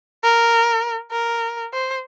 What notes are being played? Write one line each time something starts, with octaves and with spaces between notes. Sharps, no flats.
A#4
A#4
C5